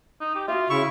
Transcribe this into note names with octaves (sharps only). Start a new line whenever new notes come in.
D#4
G4
F4 F#4 E5
C#3 E4 C#6